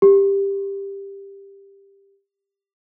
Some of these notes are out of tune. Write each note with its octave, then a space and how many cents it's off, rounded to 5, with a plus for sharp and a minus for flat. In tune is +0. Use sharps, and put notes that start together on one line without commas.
G4 +10